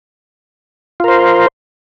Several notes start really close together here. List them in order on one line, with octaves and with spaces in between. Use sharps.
F4 A#4 C5